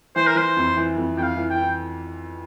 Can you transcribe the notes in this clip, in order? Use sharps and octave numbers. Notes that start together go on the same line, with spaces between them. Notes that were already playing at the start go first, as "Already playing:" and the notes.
E3 C5
A#4
E3 C5
F2
E3
F2
F2 G5
F5
E3
G5
E3